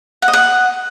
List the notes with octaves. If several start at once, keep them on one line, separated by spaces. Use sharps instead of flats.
F#5
D#5
F#5